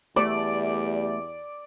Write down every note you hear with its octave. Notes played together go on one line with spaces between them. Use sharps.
E2 G3 A3 D5